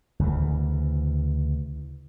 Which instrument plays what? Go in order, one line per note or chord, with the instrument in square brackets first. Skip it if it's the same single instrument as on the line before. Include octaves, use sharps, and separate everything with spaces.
[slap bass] D2 C#3 E3